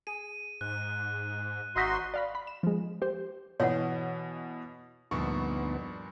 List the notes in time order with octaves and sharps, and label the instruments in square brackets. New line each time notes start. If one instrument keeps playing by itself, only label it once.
[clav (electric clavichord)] G#4 [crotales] D#7
[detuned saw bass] G#2 [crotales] F#6
[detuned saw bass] G#1 [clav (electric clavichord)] D#4 D#5 E5 [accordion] F#4 C6
[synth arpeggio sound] D5 F5 B5
B5
E7
F3 G#3
G4 C5
[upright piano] B2 E3 [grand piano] B3 D#5 [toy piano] C#5 F#5
[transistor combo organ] D2 B3 D#4 [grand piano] G2 A#2 F3 [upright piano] C#6